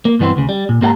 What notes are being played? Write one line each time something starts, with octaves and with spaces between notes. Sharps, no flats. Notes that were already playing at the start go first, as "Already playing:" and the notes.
A#3
B1 G2 E3 B3 C4 C5
D2 C#3
G3
A#2
G#2 A#3 G4 F#5 A5 A#5